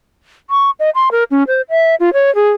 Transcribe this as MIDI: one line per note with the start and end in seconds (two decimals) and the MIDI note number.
0.50 0.70 85
0.79 0.90 75
0.95 1.09 84
1.12 1.24 70
1.31 1.43 61
1.47 1.61 72
1.70 1.95 76
2.00 2.13 65
2.13 2.33 73
2.35 2.51 68